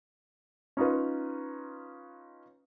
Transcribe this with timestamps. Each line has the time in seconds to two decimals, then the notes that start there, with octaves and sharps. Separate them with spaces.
0.77 C#4 D#4 F4 B4